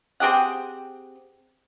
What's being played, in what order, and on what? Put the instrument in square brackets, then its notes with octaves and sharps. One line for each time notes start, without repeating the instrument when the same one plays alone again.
[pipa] C4 G4 G#4 F#5